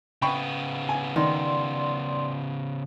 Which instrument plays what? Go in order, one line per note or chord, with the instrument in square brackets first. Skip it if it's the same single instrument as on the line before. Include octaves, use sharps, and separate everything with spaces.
[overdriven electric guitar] C#3 B3 [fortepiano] G5 B5 C#6
[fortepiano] G#5
[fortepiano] D#3 [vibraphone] D5 C6